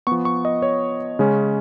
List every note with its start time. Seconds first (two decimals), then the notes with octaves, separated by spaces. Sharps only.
0.07 F3 B3 C#6
0.25 C#6
0.45 D#5
0.62 C#5
1.19 C#3 G#3 C#4